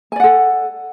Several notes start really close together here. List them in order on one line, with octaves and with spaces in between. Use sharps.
G#5 D5 F#5 A4